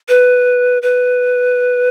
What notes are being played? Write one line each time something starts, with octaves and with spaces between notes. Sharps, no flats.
B4
B4